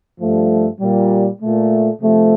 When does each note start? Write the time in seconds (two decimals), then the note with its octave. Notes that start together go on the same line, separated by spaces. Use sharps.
0.19 G2 F3 A3
0.79 A#2 G3
1.40 A#2 A3
2.01 C3 F3 A3